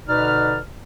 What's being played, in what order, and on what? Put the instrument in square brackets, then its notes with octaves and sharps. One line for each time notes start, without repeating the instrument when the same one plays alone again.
[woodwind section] B2 D3 D#4 B4 D5 F6